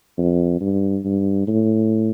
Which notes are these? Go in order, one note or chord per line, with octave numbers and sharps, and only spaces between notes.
F2
G2
G2
A2